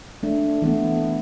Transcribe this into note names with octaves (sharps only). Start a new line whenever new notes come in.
A3 D4
E3 A3 B3